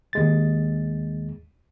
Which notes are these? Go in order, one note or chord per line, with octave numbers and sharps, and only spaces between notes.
D#2 G#3 A6